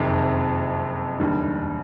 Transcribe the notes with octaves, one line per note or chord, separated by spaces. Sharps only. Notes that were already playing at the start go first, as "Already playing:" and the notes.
Already playing: F#1 F2 C3 D#3
E1 D#2 D3 G3